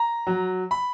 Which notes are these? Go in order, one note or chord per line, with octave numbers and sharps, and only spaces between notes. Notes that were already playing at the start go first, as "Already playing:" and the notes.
Already playing: A#5
F#3
B5